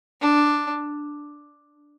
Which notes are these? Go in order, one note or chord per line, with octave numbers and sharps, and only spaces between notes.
D4